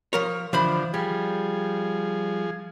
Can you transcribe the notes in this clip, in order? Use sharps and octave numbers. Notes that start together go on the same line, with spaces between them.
F3 A#4 C#5
D3 E3 F3 C5 B5
F3 G3 G#4